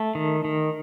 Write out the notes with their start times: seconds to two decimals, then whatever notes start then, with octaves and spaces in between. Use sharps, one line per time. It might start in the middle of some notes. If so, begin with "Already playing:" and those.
Already playing: A3
0.15 D#3
0.45 D#3